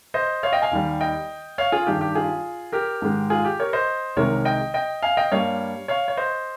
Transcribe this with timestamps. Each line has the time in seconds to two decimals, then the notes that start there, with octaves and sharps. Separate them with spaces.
0.14 C5 D#5
0.43 C#5 F5
0.53 D#5 G5
0.62 F5 G#5
0.71 D#2 D#3 G3
1.01 D#5 G5
1.58 C#5 F5
1.72 F4 G#4
1.87 G2 D#3 G3 G4
2.01 G4
2.15 F4 G#4
2.72 G4 A#4
3.02 G#2 D#3 G#3
3.30 F4 G#4
3.45 G4
3.59 A#4 C#5
3.73 C5 D#5
4.16 C2 C3 D#3 G#3 A#4 C#5
4.45 D#5 G5
4.74 D#5 G5
5.03 F5 G#5
5.17 D#5 G5
5.32 G2 G3 A#3 C#5 F5
5.88 C#5 F5
6.08 C#5
6.17 C5 D#5